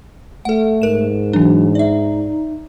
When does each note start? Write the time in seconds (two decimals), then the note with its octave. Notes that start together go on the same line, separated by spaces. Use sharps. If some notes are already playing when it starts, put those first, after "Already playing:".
0.45 A3 A4 F#5
0.82 G#2 A#4 E7
1.33 E3 F#3 D4
1.75 D#4 D5 E5